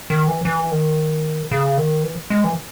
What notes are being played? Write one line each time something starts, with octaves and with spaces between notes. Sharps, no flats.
D#3
E3
E3
D#3
C#3
D#3
E3
G#3
E3